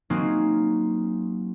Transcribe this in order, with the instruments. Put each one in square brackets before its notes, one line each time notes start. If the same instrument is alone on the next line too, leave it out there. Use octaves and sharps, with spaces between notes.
[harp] F#3 A#3 C4 C#4 D#4